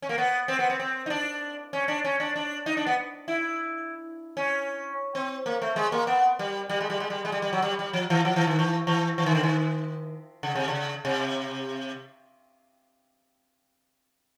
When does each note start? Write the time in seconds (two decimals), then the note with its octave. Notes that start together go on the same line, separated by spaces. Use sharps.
0.02 C#4
0.09 A#3
0.18 B3
0.48 C4
0.59 B3
0.70 C4
0.80 C4
1.06 D#4
1.10 D4
1.73 C#4
1.88 D4
2.05 C#4
2.20 D4
2.36 D4
2.66 D#4
2.77 D4
2.86 B3
3.28 E4
4.37 C#4
5.15 C4
5.46 A#3
5.62 A3
5.76 G#3
5.92 A#3
6.07 B3
6.39 G3
6.69 G3
6.81 G#3
6.90 G3
7.00 G#3
7.10 G3
7.25 G#3
7.32 G3
7.42 G3
7.53 F#3
7.62 G3
7.79 G3
7.93 F3
8.10 E3
8.25 F3
8.36 E3
8.47 D#3
8.59 E3
8.87 E3
9.18 E3
9.26 D#3
9.35 D3
9.43 D#3
10.43 C#3
10.55 C3
10.68 C#3
11.05 C3